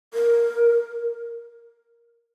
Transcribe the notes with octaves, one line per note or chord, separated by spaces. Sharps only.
A#4